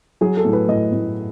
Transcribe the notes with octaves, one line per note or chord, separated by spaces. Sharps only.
F#3 G#4
A4
A2
B4
A2 D#5
A2